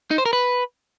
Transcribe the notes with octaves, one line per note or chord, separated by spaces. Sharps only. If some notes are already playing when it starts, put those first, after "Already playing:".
D#4
C5
A#4
B4